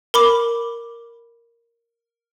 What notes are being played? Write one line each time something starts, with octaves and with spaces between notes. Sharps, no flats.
A#4 B5 D6